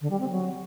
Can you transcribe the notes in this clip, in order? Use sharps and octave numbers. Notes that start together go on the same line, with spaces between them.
D3
G3
C4
F#3